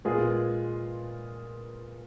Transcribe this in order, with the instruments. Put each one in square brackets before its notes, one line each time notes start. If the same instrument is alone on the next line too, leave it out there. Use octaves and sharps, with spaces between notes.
[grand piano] A#2 G#3 B3 F4 G#4